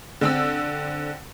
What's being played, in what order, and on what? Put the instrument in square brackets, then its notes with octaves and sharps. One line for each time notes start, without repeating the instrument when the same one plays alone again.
[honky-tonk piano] D3 C4 E6